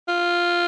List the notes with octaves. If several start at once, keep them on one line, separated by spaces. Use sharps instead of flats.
F4